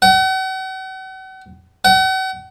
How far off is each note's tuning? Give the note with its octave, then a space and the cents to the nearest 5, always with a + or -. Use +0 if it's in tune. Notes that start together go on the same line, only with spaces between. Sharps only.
F#5 +40
F#5 +40